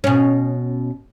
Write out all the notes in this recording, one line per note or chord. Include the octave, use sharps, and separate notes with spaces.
B2 C#4